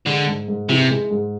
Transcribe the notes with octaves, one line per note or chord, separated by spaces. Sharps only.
D3 G#3
G#2
G#2
C3 E3
G#3
G#2